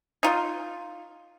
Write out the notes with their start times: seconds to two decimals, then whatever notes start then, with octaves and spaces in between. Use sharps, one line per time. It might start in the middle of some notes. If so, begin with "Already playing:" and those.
0.23 D#4 F4